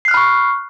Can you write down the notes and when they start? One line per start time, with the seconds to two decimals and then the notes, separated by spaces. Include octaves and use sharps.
0.05 C7
0.08 F#6
0.11 F6
0.14 B5
0.17 C#6